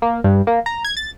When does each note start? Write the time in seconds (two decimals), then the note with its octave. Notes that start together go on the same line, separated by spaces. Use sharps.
0.02 A#3
0.24 G2
0.47 A#3
0.66 A#5
0.85 G#6
0.97 A6